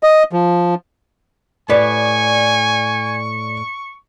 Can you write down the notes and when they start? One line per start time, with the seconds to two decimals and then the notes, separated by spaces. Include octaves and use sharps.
0.03 D#5
0.33 F3
1.70 A2 G4 B4 D5 G#5 C#6